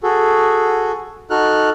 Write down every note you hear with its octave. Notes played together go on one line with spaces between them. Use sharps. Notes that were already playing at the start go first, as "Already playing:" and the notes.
F#4 G#4 A4
D#4 F#4 A4 F6 F#6